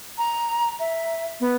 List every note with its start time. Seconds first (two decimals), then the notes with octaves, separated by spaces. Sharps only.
0.18 A#5
0.80 E5
1.40 B3